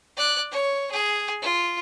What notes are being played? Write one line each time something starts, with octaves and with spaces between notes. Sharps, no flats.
D5 F#6
C#5
G#4
F4